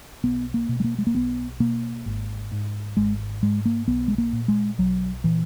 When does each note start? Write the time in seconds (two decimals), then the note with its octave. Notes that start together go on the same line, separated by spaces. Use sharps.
0.24 B1 B3
0.54 A#3
0.69 B2
0.80 G#3
0.84 A#3
0.98 G#3
1.07 A#3
1.15 B1 B3
1.60 B2 A#3
2.06 G#1
2.52 G#2
2.97 G#1 G#3
3.42 G#2 G#3
3.66 A#3
3.87 B1 B3
4.08 G#3
4.18 A#3
4.33 A#2
4.48 G#3
4.78 B1 F#3
5.24 A#2 E3